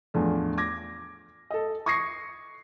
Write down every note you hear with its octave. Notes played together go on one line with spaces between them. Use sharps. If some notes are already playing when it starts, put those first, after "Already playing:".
E2 A2 F3 D4
D6 G#6 A#6
A4 D#5
C#6 D#6 G#6 A#6 C7 C#7